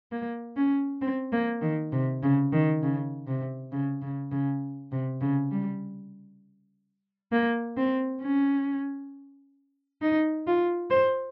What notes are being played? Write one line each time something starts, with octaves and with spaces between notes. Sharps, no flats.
A#3
C#4
C4
A#3
D#3
C3
C#3
D#3
C#3
C3
C#3
C#3
C#3
C3
C#3
G3
A#3
C4
C#4
D#4
F4
C5